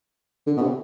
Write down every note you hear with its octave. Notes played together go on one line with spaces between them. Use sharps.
D3
B2
C3